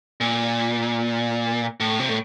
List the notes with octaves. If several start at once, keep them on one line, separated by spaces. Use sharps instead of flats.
A#2
A2
C3
A2